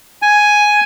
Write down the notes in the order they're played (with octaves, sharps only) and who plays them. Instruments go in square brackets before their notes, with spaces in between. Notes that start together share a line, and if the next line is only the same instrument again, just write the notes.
[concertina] G#5